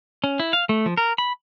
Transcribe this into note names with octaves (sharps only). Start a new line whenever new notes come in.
C#4
E4
F5
A3
F3
A#4
B5